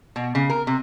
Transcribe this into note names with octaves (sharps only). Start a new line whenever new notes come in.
B2
C#3
A#4
C3